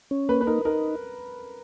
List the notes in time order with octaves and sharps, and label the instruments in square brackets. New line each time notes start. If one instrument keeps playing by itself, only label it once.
[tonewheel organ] C#4
[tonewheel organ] A#3 [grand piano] B4
[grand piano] B4
[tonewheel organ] D#4 [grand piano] A#4
[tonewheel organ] D#4 [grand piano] A#4